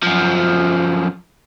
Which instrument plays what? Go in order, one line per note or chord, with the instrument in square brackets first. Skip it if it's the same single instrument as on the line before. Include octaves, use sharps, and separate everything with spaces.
[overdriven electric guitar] F#2 F3